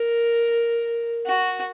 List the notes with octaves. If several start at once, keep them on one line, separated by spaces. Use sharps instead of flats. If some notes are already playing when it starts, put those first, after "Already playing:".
Already playing: A#4
F#4